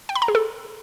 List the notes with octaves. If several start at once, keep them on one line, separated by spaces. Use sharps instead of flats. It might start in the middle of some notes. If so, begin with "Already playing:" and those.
G5
B5
A#5
G#4
A4